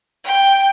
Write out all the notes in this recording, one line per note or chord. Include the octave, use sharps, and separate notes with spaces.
G5